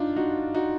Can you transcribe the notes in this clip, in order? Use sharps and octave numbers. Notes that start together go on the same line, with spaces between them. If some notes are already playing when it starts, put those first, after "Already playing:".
Already playing: D4 D#4 F4
D#4 F#4
D#4 F#4